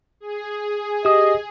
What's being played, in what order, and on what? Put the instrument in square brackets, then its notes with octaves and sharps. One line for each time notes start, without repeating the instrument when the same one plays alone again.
[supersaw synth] G#4
[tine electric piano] G4 D#6 [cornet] D#5